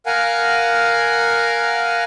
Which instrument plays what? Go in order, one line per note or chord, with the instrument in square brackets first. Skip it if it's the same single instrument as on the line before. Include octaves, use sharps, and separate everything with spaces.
[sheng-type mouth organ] A#4 F5 F#5 G#5